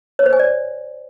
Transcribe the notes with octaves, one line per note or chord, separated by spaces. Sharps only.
C#5
C5
G#5
D5